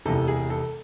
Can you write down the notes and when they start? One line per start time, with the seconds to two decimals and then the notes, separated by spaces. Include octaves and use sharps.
0.06 E1 E2 C3 A4
0.28 G#4
0.50 A4